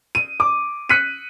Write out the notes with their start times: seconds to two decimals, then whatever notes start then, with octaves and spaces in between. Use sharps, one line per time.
0.15 D#7
0.40 D6
0.89 F#6 B6 C#7 D#7